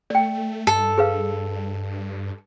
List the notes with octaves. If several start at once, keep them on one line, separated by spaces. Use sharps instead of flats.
A3 D5 G5
G2 A4
G#4 B4 F5